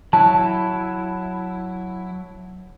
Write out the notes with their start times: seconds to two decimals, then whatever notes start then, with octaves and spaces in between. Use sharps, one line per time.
0.13 F#3 E4 A5